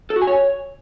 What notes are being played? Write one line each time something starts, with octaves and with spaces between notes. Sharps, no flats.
A4
F#4
G#5
C#5